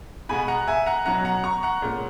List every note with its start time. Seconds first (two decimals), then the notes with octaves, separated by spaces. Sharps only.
0.29 B2 G#3 B3 G#5 B5
0.48 F#5 A#5
0.67 E5 G#5
0.86 F#5 A#5
1.06 B2 F#3 C#4 F#5 A#5
1.25 F#5 A#5
1.44 A#5 C#6
1.63 F#5 A#5
1.82 A#2 G#3 C#4